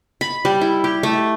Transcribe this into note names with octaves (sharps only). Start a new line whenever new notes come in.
B5
G3
E4
G4
A3